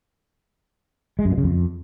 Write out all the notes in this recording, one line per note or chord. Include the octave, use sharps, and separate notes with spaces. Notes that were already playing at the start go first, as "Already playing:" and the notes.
G#3
F#2
A#2
C#3
F2